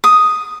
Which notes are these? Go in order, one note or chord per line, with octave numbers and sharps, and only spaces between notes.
D#6